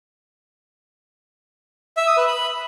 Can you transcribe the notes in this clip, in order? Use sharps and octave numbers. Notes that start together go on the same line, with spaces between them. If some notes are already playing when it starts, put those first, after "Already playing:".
E5
D#6
B4
B5